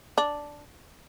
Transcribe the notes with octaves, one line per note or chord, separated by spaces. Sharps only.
D4